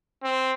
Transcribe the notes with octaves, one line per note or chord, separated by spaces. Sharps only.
C4